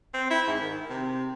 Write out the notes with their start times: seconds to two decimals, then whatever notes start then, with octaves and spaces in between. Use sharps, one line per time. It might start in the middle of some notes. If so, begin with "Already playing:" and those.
0.14 C4
0.30 E4
0.47 G#2
0.61 D#3
0.89 C3